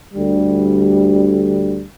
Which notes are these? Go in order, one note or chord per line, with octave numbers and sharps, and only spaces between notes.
D2 D3 G3